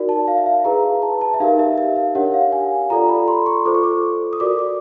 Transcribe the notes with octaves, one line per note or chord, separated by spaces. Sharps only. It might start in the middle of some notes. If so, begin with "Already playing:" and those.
Already playing: D#4 F#4 A#4 D5
A5
F5
E5
F5
E4 G#4 B4 A#5
A5
A5
E5
D#4 G4 A#4 F5
E5
E5
F5
D4 G4 A#4 C#5 F#5
F5
G#5
F4 A4 D5 A#5
B5
C6
C#6
F4 A4 C5 D6
C#6
D6
D#6
F#4 A#4 D5 D6
D6